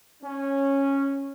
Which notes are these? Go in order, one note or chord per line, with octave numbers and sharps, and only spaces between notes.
C#4